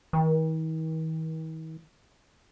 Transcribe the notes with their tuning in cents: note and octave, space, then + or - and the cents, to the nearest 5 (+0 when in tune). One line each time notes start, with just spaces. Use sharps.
D#3 +45